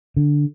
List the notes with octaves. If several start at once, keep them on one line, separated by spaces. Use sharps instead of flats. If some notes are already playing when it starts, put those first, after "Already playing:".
D3